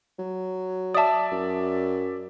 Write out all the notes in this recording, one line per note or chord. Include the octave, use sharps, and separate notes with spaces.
F#3
D5 E5 A5 D#6
F#2